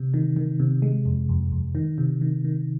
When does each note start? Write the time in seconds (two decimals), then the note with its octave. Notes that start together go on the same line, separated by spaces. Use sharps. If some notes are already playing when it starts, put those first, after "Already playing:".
Already playing: C3
0.14 D#3
0.36 D#3
0.60 C3
0.82 G#3
1.05 F2
1.29 F2
1.52 F2
1.75 D#3
1.98 C3
2.21 D#3
2.44 D#3